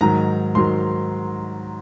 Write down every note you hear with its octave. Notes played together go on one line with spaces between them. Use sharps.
G#2 D#3 F#3 A#5
G#2 D#3 F#3 C6